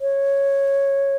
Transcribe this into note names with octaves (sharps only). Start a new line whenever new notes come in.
C#5